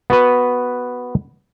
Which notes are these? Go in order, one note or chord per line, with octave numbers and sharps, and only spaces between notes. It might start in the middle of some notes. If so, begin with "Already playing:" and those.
B3 F#4 B4